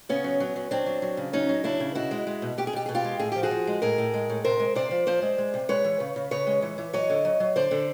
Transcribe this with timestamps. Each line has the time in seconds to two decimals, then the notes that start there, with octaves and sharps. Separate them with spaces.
0.09 C#3 B3 C#4
0.24 F#3
0.40 F#3
0.56 F#3
0.71 F#3 C4 D4
0.86 F#3
1.02 F#3
1.17 C#3
1.33 F#3 C#4 D#4
1.49 F#3
1.64 C#3 D4 E4
1.80 C#3
1.95 B2 E4 F#4
2.11 G#3
2.27 G#3
2.42 B2
2.58 B2 G4
2.67 G#4
2.73 B2 G4
2.86 B2 G#4
2.95 F4 G4
3.04 G#3
3.19 A2 G#4
3.32 F3 G4
3.43 F#4 G#4
3.51 F3
3.67 G#3
3.82 A2 G#4 A#4
3.98 A2
4.14 G#3
4.29 A2
4.44 C3 A#4 C5
4.60 G#3
4.75 C3 C5 D5
4.91 F3
5.06 F3 C5 D5
5.22 G#3
5.38 G#3
5.54 C3
5.69 G#3 B4 C#5
5.84 E3
6.00 C#3
6.16 C#3
6.31 C#3 B4 C#5
6.47 G#3
6.62 E3
6.78 E3
6.93 F#3 C#5 D#5
7.10 D3
7.25 F#3
7.40 F#3
7.56 D3 C5 D5
7.71 D3